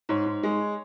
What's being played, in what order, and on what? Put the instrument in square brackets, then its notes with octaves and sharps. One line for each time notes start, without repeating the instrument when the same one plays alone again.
[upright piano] G#2 C#5
G#2
G#3